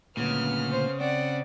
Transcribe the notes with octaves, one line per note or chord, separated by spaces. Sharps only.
D2 A#2 C#3 B3 F6
C5
C4 D5 F#5